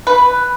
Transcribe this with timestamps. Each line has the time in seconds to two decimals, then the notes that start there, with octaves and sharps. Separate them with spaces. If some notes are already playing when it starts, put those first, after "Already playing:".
0.07 B4